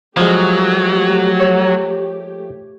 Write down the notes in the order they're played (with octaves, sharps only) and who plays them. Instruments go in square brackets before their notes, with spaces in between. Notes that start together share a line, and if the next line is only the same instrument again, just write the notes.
[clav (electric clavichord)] F3 G#3 [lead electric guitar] F#3 [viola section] A3 G4
[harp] C#5